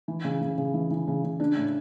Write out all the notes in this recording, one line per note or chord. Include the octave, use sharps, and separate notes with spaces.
E3
C#3
C#3
C#3
E3
E3
C#3
C#3
D4
A2